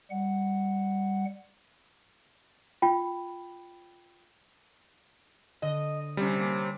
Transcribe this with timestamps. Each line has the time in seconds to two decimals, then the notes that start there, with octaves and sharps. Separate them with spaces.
0.10 G3 F#5
2.82 F4 G5 B5
5.62 D3 D#5
6.17 C3 G3 C#4
6.37 A#3 D6